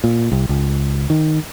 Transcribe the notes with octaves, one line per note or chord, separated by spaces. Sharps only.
A#2
C2
C#2
D#3